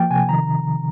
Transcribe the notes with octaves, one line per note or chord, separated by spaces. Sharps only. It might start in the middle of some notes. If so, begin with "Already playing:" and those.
Already playing: F3 A#3 G5
C3 G#5
D#3 A#5